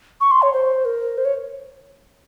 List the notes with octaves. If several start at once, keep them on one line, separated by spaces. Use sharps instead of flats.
C#6
C6
C#5
C5
A#4
C5
C#5